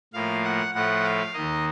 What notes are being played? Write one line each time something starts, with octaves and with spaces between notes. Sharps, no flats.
A2 F3 A#3 F5
F#5
A2 F3 A3 F#5
F5
D#2 D#3 A#3 D#5